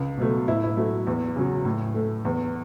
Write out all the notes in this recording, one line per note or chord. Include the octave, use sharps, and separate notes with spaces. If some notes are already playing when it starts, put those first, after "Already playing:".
Already playing: C#2
B2 F#3 A3
A2 E4
E4
F#3 A3
E2
C#3 F#3
A2
A3
E2